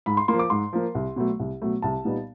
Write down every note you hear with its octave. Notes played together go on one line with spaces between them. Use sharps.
G#2 B5
C6
F3 A#3 C6
D6
G#2 C6
F3 A#3
C2
B2 F#3 A3
C2
B2 F#3 A3
C2 A5
A#2 G3 B3 D#4